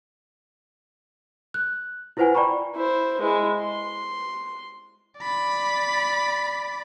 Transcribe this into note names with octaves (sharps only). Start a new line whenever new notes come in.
F#6
E4 F4 B4 C5 F#5 G#5
D5 G5 A#5 B5 C#6
E4 C5
G#3 E4
C6
D5 B5